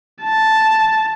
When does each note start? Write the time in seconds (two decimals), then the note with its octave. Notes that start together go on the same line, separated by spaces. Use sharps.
0.24 A5